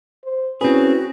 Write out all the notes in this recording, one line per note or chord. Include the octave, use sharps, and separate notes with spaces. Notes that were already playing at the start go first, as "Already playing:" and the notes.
C5
C4 C#4 E4 F#4 G#4 B4